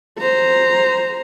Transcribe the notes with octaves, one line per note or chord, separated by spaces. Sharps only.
C5 A#5